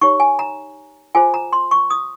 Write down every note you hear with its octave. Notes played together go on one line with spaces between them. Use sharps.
D#4 G4 C#5 C#6
G#5
A#5
F4 G#4 C5 G#5
A#5
C6
C#6
D#6